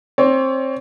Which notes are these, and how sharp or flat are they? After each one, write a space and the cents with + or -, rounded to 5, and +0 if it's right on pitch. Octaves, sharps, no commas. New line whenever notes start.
C4 +20 C#5 +40